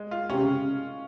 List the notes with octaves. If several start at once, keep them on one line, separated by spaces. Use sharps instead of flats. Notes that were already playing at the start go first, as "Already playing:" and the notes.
Already playing: G#3
F4
C3 C#4
C#3